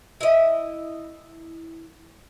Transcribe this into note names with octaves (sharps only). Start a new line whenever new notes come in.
E4 D#5